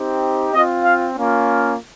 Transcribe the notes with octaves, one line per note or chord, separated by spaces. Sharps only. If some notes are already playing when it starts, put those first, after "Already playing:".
Already playing: C4 D#4 G4
C4 F4 D#5
F5
A#3 C#4 F4